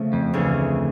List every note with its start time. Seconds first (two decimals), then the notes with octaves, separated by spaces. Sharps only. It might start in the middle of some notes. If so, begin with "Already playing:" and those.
Already playing: C#3 F3 A3 C#4
0.13 F2
0.33 D2 C#3 E3